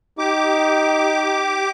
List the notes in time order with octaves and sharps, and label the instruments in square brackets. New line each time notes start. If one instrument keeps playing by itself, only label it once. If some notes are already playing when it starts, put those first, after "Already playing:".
[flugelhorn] D#4 [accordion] G4 D6